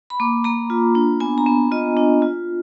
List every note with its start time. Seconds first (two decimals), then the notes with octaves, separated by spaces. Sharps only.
0.10 B5
0.20 A#3 D6
0.44 A#3 A#5
0.70 F4
0.95 D4
1.20 B3 G#5
1.38 A#5
1.46 B3
1.71 F4 D#5
1.97 D4
2.22 F4